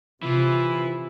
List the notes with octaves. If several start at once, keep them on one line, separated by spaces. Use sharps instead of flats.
C3 E3 E4 F4